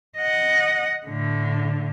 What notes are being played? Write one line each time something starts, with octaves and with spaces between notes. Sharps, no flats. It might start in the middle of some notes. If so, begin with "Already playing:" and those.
D#5 F#5
A2 D3